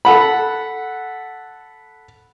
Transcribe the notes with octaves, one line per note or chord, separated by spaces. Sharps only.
A4 F#5 B5